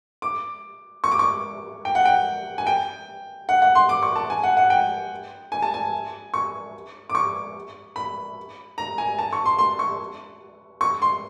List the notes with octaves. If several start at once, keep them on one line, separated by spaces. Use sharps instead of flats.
D6
C#6
D6
C#6
G5
F#5
G5
G#5
G5
F#5
F#5
C6
D6
C#6
A5
G#5
F#5
F#5
G5
G#5
A5
G#5
C#6
D6
C#6
B5
A#5
G#5
A5
C#6
C6
C6
C#6
C#6
C6